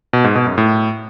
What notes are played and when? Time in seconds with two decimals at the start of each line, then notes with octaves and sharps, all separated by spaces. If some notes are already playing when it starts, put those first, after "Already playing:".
0.13 B2
0.24 G#2
0.35 B2
0.46 F#2
0.58 A2